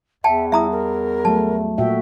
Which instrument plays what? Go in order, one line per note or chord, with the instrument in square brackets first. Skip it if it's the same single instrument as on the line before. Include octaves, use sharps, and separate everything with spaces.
[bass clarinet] E2 [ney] E5 [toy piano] G5 A5
[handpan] G3 [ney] E4 [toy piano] E5 A#5 D#6
[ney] A#4
[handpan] F#3 A3 [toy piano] A5
[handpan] A#2 F#4 E5 [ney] G5